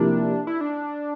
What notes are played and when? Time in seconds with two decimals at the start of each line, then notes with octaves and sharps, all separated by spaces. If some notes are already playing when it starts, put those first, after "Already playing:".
Already playing: C3 F3 A#3 D4 E4
0.47 E4
0.61 D4